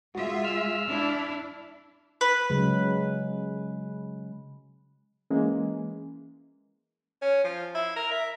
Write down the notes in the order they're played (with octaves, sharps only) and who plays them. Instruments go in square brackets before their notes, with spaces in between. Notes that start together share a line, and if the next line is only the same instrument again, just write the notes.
[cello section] G#3 F4 E5 [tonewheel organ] F#4
[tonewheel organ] E6 F6
[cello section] D4 E4
[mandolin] B4
[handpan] C#3 F#3 G#3
[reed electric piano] E3 G#3 A#3 [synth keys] C#4
[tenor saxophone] C#4
F3
E4
A#4
E5